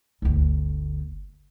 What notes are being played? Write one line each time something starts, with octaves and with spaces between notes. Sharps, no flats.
G1 D2